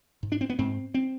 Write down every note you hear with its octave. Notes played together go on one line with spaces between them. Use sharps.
G#2
D4
C4
B3
G#2 C4
C4